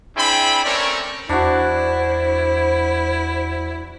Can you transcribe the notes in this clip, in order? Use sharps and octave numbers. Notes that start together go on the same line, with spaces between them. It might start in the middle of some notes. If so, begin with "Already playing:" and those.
C4 D4 E4 G#4 G5 B5
A3 C4 C#4 A#4 C#5 D5
E2 D4 E4 F#4 C5